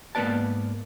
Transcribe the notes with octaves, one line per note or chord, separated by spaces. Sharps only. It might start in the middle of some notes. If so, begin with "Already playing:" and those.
G#2 A#3 B3 B4 D5 A5